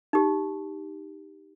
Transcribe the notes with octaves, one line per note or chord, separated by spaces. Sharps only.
D#4 G4